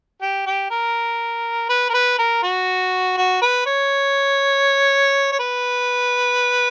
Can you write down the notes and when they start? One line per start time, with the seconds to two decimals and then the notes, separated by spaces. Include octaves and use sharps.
0.21 G4
0.46 G4
0.70 A#4
1.69 B4
1.89 A#4
1.94 B4
2.19 A#4
2.43 F#4
3.17 F#4
3.42 B4
3.66 C#5
5.32 C#5
5.39 B4